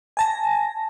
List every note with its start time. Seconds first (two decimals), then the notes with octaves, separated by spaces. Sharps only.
0.17 G#5 A5 A#6